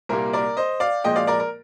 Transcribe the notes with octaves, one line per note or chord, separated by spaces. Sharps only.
C2 A#2 G3 A#3 A#4
A#4 D5
C5 D#5
D5 F5
A#2 F3 G#3 D#5 G5
D5 F5
A#4 D5
A#4